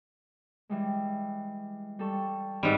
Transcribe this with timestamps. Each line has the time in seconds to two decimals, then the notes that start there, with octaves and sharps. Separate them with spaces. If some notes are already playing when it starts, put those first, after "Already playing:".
0.69 E3 G3 G#3
1.99 G3 A4 C#6
2.63 G#2 G3 C4 F#6